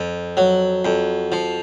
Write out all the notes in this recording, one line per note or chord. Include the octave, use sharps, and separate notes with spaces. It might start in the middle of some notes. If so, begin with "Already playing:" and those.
Already playing: F2
F#3
F2
F3